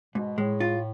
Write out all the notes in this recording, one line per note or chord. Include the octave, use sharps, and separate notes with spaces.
G#2 B2
A2 G#3
F4